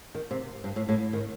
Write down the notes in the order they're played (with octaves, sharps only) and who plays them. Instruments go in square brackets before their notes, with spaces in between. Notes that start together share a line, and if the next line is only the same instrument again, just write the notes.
[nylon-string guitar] D#3
C3
G2
A2
A2
D#3